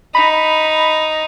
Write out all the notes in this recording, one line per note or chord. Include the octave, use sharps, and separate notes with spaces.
D#4 B5